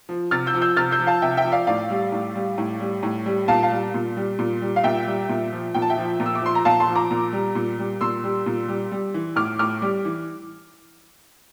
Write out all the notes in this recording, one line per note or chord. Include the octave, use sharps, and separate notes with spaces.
F3
C3 F6 A6
E6 G6
F3
E6 G6
C3 F6 A6
E6 G6
F3
F5 A5
C3 E5 G5
E5 G5
F3
D5 F5
A2 D5 F5
G3
A2
G3
A2
G3
A2
G3
A#2 F5 A5
F5 A5
G3
A#2
G3
A#2
G3
F5
A#2 E5 G5
G3
A#2
F3
A#2 G5
A5
E5 G5
F3
A#2
E6
D6
F3 C6
A#5
A#2 F5 A5
A5 C6
F3
A#5 D6
A#2
G3
A#2
G3
A#2 C6 E6
G3
A#2
G3
G3
E3
A2 D6 F6
A2 D6 F6
G3
E3